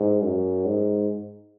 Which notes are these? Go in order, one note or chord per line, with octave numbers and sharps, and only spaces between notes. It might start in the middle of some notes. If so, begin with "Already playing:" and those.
Already playing: G#2
F#2
G#2